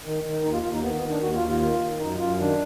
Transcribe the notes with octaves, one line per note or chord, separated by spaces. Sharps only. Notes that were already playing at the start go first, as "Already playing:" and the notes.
D#3
D#3
D#2 D#4
F4
D#2 F4
D#4
D#3 B3
B3
D#3
D4
D#2 F#4
F4
D#2
F4
D#3 F4
D#3
F#2 D#4
F#2 F4
D#3 D4